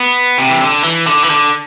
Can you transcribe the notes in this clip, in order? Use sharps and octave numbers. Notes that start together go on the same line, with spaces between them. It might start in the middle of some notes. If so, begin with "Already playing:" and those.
Already playing: B3
C3
E3
D3
E3
D3
E3
D3